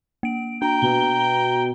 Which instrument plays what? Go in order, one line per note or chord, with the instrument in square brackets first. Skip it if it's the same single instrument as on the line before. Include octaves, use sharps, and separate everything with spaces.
[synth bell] A#3 D7
[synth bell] D4 [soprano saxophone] G5 [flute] A#5
[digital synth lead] B2 [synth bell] G7